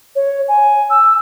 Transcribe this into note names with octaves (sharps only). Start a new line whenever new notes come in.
C#5
G#5
E6